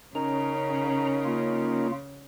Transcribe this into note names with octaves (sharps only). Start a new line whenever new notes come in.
C#3 C#4 D#4 A#4 A#5
A#3 F4